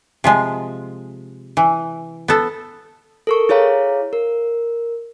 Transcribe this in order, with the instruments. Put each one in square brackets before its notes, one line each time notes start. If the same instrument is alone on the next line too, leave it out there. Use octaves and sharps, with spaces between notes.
[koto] C3 F3 G#3
E3
B3 A4
[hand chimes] A4 A#4 C#6
E4 G#4 C#5 F5 A#5
A#4